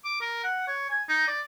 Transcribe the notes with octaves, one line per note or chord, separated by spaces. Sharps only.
D6
A#4
F#5
C#5
G#5
D#4
D5